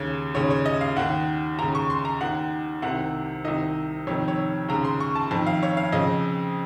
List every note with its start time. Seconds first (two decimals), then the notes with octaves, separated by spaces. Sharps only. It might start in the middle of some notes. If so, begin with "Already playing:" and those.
Already playing: D#2 C#3 C#5
0.34 D#2 C#3 C#5
0.50 C#5
0.66 D#5
0.81 F5
0.97 D#2 D#3 F#5
1.59 D#2 A#5
1.62 C#3
1.75 C#6
1.90 C6
2.05 A#5
2.21 D#2 D#3 F#5
2.82 C2 C3 D#3 F#5
3.44 C2 C3 D#3 D#5
4.07 F2 C3 D#3 C#5
4.28 C#5
4.68 D#2 C#3 A#5
4.85 C6
5.00 C#6
5.15 A5
5.31 F2 D#3 A5
5.46 F5
5.63 C#5
5.77 F5
5.93 F2 C#3 D#5